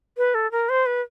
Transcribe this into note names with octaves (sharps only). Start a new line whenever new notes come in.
B4
A4
A#4
C5
B4